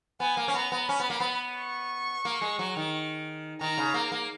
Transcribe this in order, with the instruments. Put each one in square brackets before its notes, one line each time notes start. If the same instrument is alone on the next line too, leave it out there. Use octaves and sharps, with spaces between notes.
[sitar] B3 [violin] G#5
[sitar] A#3
C#4
[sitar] B3 [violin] A#5
[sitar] B3
[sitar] C#4 [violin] B5
[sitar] B3
A#3
B3
[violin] C#6
[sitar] A#3
G#3
F#3
D#3
[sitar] D#3 [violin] A#5
[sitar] C#3
A#3
A#3